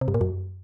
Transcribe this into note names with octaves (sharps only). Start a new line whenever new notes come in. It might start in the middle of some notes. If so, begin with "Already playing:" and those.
C3
G2
A#2
F#2